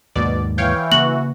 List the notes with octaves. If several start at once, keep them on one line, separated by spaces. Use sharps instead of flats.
D#2 G#2 B2 A#3 D5
E3 C#5 F5 G5
C#3 A#3 F#4 F#7